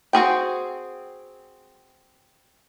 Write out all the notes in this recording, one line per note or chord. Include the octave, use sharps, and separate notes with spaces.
C4 F#4 G#4 G5